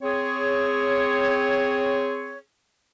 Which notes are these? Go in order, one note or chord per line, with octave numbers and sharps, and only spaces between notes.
C4 G#4 C#5